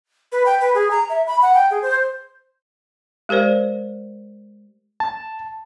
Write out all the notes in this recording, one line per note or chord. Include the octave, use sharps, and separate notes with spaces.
B4
G5
B4
G#4
A#5
E5
B5
F#5
G5
G#4
C5
G#3 G4 A#4 C5 D5
A5